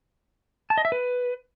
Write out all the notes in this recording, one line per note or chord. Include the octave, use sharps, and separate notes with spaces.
A5
D#5
E5
B4